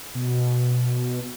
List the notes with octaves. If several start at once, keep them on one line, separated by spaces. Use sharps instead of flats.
B2